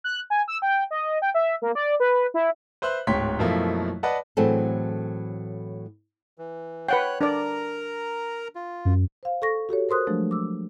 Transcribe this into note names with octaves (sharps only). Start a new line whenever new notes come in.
F#6
G#5
E6
G5
D#5
G5
E5
A#3
D5
B4
E4
B4 C5 E5 C6 F#6
D1 G#2 C#5 G5 C6 B6
F#2 B2 F3 A3 A#3 E4
B4 D5 D#5 F#5 A5
A2 E3 F#3 C4 G#4 A4
E3
B4 C#5 F#5 G5 F#6
D4 A#4 D5 A#5
F4
F#2
C5 F5
A4 C#6 A#6
F#4 G4 A4 C#5
A#4 C5 C6 D#6 F#6
F3 F#3 G#3 A3 D4
D6 E6